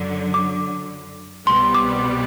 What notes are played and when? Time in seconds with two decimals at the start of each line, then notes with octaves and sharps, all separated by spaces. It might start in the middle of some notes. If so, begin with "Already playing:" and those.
Already playing: F#2 D3 F#3
0.34 D6
1.47 C2 B2 G3 B3 C6
1.75 D6